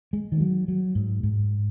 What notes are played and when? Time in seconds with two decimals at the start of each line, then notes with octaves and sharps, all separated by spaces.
0.13 G#3
0.32 D#3
0.41 F#3
0.68 F#3
0.95 G#2
1.23 G#2